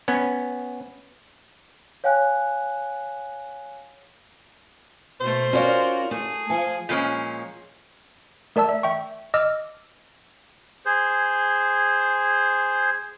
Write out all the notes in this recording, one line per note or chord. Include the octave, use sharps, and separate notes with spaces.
B3 C#4
C#5 F5 G5 G#5 F#6
B2 A3 C5
C#4 F4 F#4 A#4 D5
A3 G#4
F3 G#5
A#2 F3 G#3 C#4
A3 A#4 D5 A5 E6
E5
E5 G5 C#6
D#5 D6 E6 F6
G#4 C5